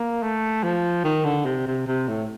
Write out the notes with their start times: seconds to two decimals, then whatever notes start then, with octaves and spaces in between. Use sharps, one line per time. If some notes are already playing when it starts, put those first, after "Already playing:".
Already playing: A#3
0.23 A3
0.64 F3
1.05 D#3
1.25 D3
1.46 C3
1.67 C3
1.87 C3
2.08 A2